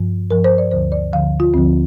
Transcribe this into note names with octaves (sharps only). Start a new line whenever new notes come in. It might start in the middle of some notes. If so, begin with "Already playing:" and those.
Already playing: G2 F3
G2 F3 A#4
C5
D5
D2 D3 F3 C5
D5
D2 D3 F3 F5
F4
D2 D3 F3 C4